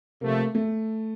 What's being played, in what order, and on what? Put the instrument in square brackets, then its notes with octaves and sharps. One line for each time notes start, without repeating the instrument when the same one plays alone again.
[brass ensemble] C3 F3 A3 [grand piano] A#3
[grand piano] A3